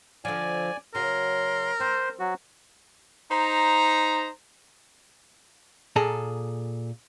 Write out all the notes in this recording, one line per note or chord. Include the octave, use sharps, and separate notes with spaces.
D3 F3 D5 G#5
C#3 F#3 A#4 C6
C4 C5
F#3 F#4
D#4 C5 A#5
A#2 G#4 A4 A#5